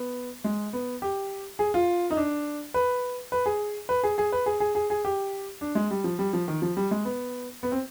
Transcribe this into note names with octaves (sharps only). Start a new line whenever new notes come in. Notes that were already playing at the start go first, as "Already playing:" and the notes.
Already playing: B3
G#3
B3
G4
G#4
F4
D#4
D4
B4
B4
G#4
B4
G#4
G#4
B4
G#4
G#4
G#4
G#4
G4
D4
G#3
G3
F3
G3
F3
D#3
F3
G3
G#3
B3
B3
C4